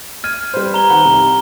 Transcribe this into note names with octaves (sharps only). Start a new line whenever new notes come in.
F6 G#6 D#7
G3 B4 C5
A#5 G7
D#3 F#5 B5
C2